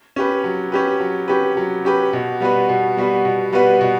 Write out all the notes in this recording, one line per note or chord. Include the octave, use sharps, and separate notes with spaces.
C#4 G4 B4
F#3
C#4 G4 B4
F#3
C#4 G4 B4
F#3
C#4 G4 B4
B2
G3 B3 F#4 B4
B2
G3 B3 F#4 B4
B2
G3 B3 F#4 B4
B2